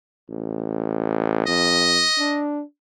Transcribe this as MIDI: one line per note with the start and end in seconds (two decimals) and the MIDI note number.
0.30 1.45 33
1.47 2.05 41
1.47 2.43 75
2.18 2.63 62